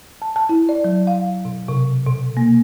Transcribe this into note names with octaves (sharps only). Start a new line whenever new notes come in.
A5
A5
E4
D5
F#3
F5
B2
C3
B2
A#3